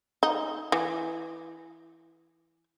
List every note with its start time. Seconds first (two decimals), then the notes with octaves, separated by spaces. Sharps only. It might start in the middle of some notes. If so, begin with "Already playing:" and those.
0.23 D#4
0.72 E3